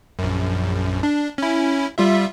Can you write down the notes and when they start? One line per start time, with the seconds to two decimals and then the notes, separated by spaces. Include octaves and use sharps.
0.19 A#1 F#2
1.03 D4
1.38 C#4 E4
1.98 G3 F4 E5